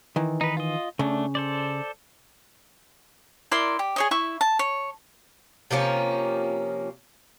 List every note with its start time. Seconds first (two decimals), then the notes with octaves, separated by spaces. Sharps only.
0.16 D#3 E3
0.41 D#4 B4
0.57 F4 D#5
0.99 C#3 A3 D4
1.35 A4 C5 D5
3.51 E4 A#4 D5 C6
3.79 G4
3.96 G#4 C#5 D#5
4.11 E4 E5 C#6
4.41 A5
4.59 C#5
5.71 C3 F3 A#3 C#4